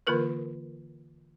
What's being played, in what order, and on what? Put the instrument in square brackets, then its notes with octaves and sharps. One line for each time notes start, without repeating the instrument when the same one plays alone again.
[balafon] D3 E3 A#3 F4 A#4 B4